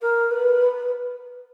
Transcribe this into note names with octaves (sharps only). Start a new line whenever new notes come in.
A#4
B4